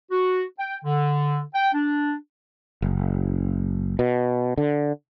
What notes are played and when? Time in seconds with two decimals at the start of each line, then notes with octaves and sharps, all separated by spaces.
0.11 F#4
0.59 G5
0.84 D3
1.55 G5
1.73 D4
2.82 F#1
3.99 B2
4.58 D3